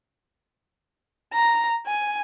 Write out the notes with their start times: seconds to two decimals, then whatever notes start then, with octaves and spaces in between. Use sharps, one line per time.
1.33 A#5
1.87 G#5